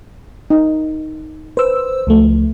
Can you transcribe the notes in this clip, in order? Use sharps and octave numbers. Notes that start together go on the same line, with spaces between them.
D#4
B4 C5 E6
C#2 F3 A3